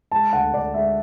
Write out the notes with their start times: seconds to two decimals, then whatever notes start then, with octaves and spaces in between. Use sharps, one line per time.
0.12 G#3 A5
0.33 D2 F#5
0.53 D2 D5
0.74 G#3 E5